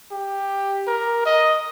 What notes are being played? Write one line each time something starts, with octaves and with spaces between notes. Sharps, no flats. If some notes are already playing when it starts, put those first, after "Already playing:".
G4
A#4
D#5